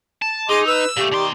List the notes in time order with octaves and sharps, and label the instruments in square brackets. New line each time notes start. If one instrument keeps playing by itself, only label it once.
[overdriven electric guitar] A5
[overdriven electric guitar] D#4 [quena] G#4 [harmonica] D#5 C6 D6
[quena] B4 [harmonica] E6
[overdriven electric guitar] A#2 A3 [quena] G4
[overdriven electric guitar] B2 C6 [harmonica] D#3 D5